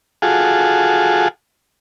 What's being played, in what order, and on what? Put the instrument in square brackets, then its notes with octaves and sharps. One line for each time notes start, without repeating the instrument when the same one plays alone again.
[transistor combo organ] F4 F#4 G#4 A4